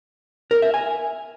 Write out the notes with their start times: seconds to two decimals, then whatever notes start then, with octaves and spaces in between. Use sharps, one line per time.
0.51 A#4
0.62 E5
0.74 G#5